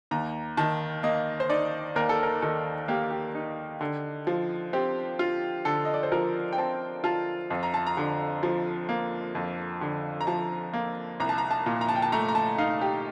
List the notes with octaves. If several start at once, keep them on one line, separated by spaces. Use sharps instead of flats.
D#2 A#5
D#3 A5
A#3 D#5
C5
D#4 D5
D#2 A#4
A4
A#4
D#3 A4
A#3 G4
G4
D#4
D3
F3
C4 G4
F4
D3 A4
D#5
D5
C5
F3 A#4
G5
C4 A5
F4 A5
F2
A#5
A5
A#5
D3
F3
A#3
F2
D3
A#5
F3 A5
A#3
C2 A#5
A5
A#5
A5
A#2
A#5
A5
G5
A5
A3 A#5
A#5
A5
D#4 F5
G4